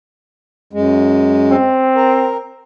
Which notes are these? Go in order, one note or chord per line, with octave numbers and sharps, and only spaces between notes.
F#2 G#3
C4
A#4